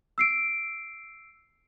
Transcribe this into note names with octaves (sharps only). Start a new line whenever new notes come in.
E6 C7 D7